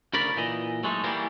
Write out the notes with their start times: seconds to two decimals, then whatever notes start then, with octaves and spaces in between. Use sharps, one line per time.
0.13 D2 C#3 A#4 D5 B5
0.36 A#2 E3 D#5
0.83 F#3 G#3 A3 D#4
1.04 E3 F#3 G3 A#3 B3